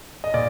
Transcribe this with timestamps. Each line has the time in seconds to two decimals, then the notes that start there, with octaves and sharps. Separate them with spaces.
0.24 D#5
0.34 A#2 D5